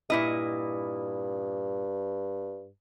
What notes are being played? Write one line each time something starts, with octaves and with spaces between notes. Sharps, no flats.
G2 A#2 E4 D#5